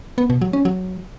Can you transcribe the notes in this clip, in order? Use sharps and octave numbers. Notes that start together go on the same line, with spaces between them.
B3
B2
F#3
C#4
F#3